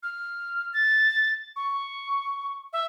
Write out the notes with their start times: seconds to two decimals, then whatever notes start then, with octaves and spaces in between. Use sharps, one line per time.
0.03 F6
0.73 A6
1.56 C#6
2.73 E5